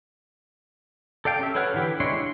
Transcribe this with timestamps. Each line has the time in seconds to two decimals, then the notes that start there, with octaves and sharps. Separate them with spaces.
1.25 A4 D5 F5 G5 A5
1.39 C#4 G4 E5
1.55 A4 B4 C#5 F#5 F6
1.74 D3 E3 E4 G4 B4
2.00 G#3 D4 E4 C#5 C6
2.18 C6